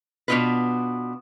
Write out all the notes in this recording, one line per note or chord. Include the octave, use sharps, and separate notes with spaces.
B2 B3 D4 D#4 F4 B4